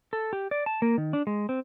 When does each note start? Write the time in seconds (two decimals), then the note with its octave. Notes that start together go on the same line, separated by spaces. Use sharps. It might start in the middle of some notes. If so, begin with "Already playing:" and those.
0.13 A4
0.33 G4
0.51 D5
0.66 A5
0.82 A#3
0.98 D#3
1.13 D4
1.27 G#3
1.49 C4